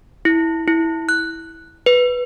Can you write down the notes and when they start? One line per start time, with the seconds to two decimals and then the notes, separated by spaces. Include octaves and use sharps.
0.25 E4
0.68 E4
1.09 F#6
1.86 B4